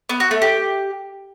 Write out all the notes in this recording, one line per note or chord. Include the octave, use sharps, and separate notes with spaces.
B3
F#4
A3
G4